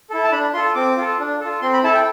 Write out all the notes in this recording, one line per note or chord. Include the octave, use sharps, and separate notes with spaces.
E4 A4
A5
D4 B5
F4 A4 C6
C4 D6
F4 A4
D4
F4 A4
C4 C6
B5
E4 A4 A5
G5